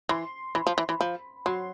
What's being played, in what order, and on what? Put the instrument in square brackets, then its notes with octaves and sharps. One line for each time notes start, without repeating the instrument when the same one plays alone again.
[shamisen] E3 [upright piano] C6
[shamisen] E3 [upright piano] B5
[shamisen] F3
E3
E3
[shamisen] F3 [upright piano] B5
[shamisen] F#3 [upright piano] C6